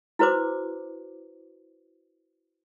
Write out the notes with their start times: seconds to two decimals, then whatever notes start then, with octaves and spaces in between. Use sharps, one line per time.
0.19 E4 F#4 B4 C5 D6